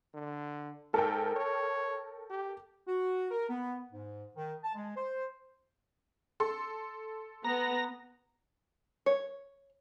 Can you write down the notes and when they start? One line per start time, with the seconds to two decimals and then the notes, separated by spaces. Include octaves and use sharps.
0.14 D3
0.94 G#2 A4 A#4 G5
1.36 C#5
2.30 G4
2.88 F#4
3.31 A#4
3.50 B3
3.92 G#2
4.36 D#3
4.63 A5
4.75 G#3
4.96 C5
6.40 A4 C6
7.45 B3 A#5
9.06 C#5